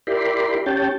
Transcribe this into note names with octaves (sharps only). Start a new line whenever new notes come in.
E4 G4 A#4 D5 B5 C6
C#4 G4 C#5 G5 A5